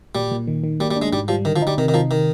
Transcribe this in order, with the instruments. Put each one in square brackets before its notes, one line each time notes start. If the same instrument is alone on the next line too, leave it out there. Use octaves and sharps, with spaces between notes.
[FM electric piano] A#2 [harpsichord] G3
[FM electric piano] A#2
D#3
D#3
[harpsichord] G3 [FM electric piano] A#3
[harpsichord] G3
[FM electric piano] D4
[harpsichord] G#3
[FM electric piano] G#2 [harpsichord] G3
[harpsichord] F3 [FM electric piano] G3
[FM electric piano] D3 [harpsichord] D#3
[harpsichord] F3
[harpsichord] G3 [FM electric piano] D#4
[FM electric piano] C3 [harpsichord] D#3
[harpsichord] D#3
[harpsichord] F3 [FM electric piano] D#4
[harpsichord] D#3